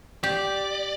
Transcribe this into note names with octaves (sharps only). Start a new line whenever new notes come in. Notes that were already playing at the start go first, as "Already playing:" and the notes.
G4 D5